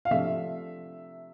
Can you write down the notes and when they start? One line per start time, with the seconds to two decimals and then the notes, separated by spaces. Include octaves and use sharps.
0.05 F5
0.11 C3 F3 A3 D4 E5